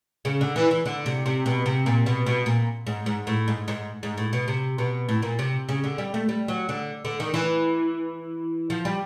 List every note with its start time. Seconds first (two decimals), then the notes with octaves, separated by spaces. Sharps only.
0.25 C#3
0.41 D3
0.56 E3
0.71 E3
0.86 D3
1.06 C3
1.26 C3
1.46 B2
1.66 C3
1.86 A#2
2.06 B2
2.26 B2
2.46 A#2
2.87 G#2
3.06 G#2
3.27 A2
3.48 G#2
3.68 G#2
4.03 G#2
4.17 A2
4.33 B2
4.48 C3
4.78 B2
5.09 A2
5.22 A#2
5.39 C3
5.69 C#3
5.84 D3
5.98 G3
6.14 A3
6.29 G3
6.48 F#3
6.69 D3
7.05 D3
7.20 D#3
7.34 E3
8.70 F3
8.85 G3